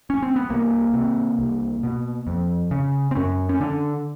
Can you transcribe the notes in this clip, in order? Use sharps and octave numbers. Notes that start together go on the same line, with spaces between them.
C#4
C4
B3
C2 A#3
C3
C2
B2
F2
C#3
C4
F#2 C#4
C#4
D3 D4